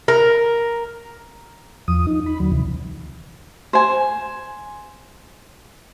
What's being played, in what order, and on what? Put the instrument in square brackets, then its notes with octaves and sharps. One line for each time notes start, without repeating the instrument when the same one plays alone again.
[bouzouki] A#4
[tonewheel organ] E2 F3 D#6
D#4
B5
D#2 D3 F#3
D2 C3 E3
[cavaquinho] C5 G#5